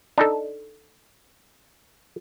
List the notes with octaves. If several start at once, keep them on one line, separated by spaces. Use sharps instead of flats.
D4 D#4 A4